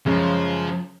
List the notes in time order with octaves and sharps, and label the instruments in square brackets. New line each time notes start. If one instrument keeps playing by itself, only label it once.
[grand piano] F#2 C#3 G#3 [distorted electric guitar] F3